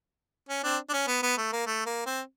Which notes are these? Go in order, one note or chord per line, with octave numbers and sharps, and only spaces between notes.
C#4
C4 D4
D4
C#4
B3
B3
A3
A#3
A3
A#3
C4